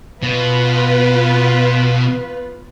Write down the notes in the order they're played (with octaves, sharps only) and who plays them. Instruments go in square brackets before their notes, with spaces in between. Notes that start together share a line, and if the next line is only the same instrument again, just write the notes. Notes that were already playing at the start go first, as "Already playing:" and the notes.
[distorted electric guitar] B2 [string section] B3 F4 B4